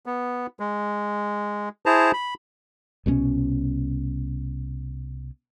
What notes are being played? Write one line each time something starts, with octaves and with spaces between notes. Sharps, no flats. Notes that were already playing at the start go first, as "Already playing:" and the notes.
B3
G#3
E4 G#4 C5 A5 A#5
B5
C2 B2 F3 C#4